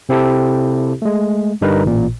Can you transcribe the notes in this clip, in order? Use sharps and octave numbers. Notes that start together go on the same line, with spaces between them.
C3 C4 E4 G4 A4
G#3 A3
G2 D3 G3 D#4 A#4 B4
A1 A#2